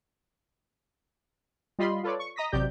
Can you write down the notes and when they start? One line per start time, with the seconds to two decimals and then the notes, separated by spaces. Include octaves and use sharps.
1.79 G3 F4 D#5 B5 C6
2.03 F4 A4 B4 C#5 D5
2.19 C#6
2.36 D#5 A#5 D#6 A#6 B6
2.52 A1 C3 F#3 G4 D5 G6